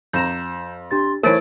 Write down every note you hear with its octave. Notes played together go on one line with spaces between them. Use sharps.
F2 A#5 G6 E7
D4 G4 C6 A6
E3 A3 A#4 C5 C#5 A6 D7